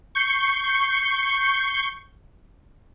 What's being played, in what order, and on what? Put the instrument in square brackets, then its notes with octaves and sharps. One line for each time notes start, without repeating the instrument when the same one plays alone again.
[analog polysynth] C#6 G6 C7 C#7